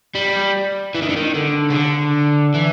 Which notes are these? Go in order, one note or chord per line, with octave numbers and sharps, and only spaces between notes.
G3
E3
D#3
D3
D#3
D3
C#3
D3
E3